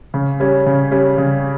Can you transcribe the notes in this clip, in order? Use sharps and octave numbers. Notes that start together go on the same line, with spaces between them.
C#3
G3 C#4
C#3
G3 C#4
C#3